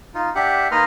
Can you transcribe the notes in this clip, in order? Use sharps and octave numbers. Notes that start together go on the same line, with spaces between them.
D#4 F4
D4 G4 E5 F#5
A#3 D#4 B4 D#5 C6 F6